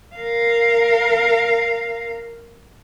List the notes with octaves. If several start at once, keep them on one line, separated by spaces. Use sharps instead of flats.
A#4 F5